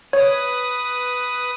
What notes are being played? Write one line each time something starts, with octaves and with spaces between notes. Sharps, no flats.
B4 C#5 D#6